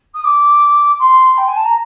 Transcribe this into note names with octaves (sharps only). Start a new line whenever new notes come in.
D#6
D6
C6
G5
G#5
A5
A#5